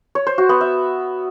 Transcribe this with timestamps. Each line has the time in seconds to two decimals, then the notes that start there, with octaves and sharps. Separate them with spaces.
0.15 C#5
0.27 C5
0.38 F#4
0.49 B3
0.61 E5